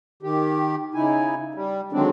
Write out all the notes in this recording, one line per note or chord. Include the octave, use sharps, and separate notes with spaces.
D#3 G4
C#3 D#4 E4 G#5
G3
D3 D#3 F#3 G#3 C4 D4